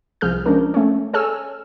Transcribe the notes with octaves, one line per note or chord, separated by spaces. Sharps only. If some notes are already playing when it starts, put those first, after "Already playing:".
C2 F3 G#4 F6 G6
F3 G#3 C#4 D4 A#4
A3 C#4
G#4 A4 C#5 G#5 E6 F6